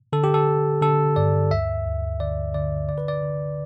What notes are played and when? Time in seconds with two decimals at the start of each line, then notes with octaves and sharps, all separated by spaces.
0.13 D3 A4
0.24 G4
0.34 A4
0.47 D3
0.81 D3 A4
1.16 G2 D5
1.51 D2 E5
1.86 D2
2.20 D3 D5
2.54 D3 D5
2.88 D3 D5
2.98 B4
3.08 D5
3.23 D3